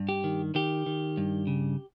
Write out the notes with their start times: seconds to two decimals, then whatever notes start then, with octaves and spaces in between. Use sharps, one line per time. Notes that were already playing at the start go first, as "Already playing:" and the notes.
Already playing: G2
0.09 G4
0.24 D#3
0.55 D#3 G4
0.86 D#3
1.17 G2
1.47 C#3